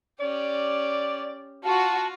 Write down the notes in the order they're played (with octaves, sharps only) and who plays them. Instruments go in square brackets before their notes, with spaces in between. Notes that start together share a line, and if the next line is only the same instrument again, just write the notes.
[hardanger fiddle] C#4 G4 [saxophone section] D5
[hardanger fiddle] F4 [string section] F#4 [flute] A5